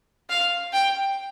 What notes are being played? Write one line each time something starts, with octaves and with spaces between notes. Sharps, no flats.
F5
G5